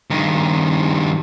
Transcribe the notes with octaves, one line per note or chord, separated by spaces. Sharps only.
G2 D#3